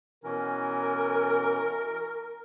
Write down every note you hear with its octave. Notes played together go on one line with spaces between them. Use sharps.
B2 E3 C#4 A#4